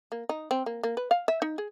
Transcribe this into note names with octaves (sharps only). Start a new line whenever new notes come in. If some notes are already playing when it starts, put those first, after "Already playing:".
A#3
D#4
C4
A#3
A#3
B4
F5
E5
D#4
G#4